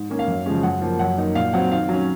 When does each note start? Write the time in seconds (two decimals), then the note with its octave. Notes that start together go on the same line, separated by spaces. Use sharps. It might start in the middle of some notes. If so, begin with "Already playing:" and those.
Already playing: G#2
0.10 D#3 A#3 C#4
0.19 F5
0.28 F#2
0.46 C#3 F3 G#3 C#4
0.63 F#2 F#5
0.81 F3 A#3
0.99 F#2 F#5
1.18 D#3 A#3 D#4
1.35 A#2 F5
1.54 F#3 C4 F#5
1.71 D#3 F5
1.89 F#3 C#4